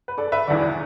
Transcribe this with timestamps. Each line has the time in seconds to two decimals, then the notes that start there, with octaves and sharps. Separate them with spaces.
0.08 B4
0.18 A4 D5
0.32 B4 E5
0.47 E1 E2 E3 D5 F#5